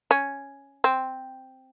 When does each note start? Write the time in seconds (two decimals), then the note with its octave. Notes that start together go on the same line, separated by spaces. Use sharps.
0.11 C#4
0.84 C4